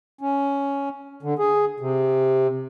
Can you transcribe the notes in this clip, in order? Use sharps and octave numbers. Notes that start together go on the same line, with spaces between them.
C#4
D3
G#4
C3